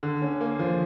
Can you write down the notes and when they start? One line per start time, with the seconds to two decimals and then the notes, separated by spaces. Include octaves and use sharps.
0.03 D3
0.22 C#4
0.41 A#3
0.59 F3